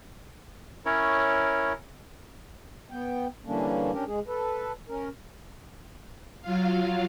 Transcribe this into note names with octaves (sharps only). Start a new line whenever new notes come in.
C#4 E4 A#4 C#5
B3 G5
D3 E3 G3 A#3 C#4 D4
C#4 D4 G4 A#4
G#3 G#4
A4 B4
C#4 A#4
F#3 F4 F5